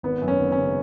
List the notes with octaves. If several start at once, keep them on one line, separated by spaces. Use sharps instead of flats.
G#1 B3
F#2
C#4
G#1
C#4
C#3